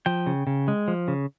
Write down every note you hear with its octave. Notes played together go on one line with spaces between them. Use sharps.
F3 G5
C#3
C#3
G#3
F3
C#3